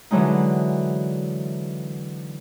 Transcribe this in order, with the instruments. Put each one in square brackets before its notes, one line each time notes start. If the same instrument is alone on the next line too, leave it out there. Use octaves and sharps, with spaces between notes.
[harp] D3 E3 F#3 G#3 D#4